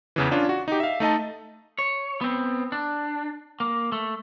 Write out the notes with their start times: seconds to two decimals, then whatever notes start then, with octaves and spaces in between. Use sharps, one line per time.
0.16 E2 C#3 E3
0.31 C#4 D4 F4
0.49 F#4
0.68 D#4 G4
0.80 E5 F5
1.00 A3 D#4 D#5 A5
1.79 C#5
2.21 B3 C4
2.72 D4
3.60 A#3
3.92 A3